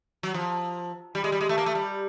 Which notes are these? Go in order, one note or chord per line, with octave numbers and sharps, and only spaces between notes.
F#3
F3
G3
G#3
G3
G#3
A3
A#3
A3
G3